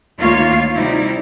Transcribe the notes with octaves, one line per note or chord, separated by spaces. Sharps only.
D2 D#3 A#3 F4 C#5 F5
C3 G3 D#4 E4